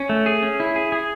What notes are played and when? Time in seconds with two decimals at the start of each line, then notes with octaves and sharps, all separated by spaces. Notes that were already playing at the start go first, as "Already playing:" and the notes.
Already playing: C#4
0.09 A3
0.26 G#4
0.43 C#4
0.60 E4
0.76 G#4
0.92 G#4